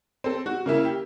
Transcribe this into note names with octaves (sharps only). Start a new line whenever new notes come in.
C4 A4
F#4
C#3 A#3 E4
G4